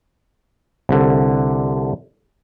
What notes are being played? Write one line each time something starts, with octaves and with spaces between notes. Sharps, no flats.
C2 D3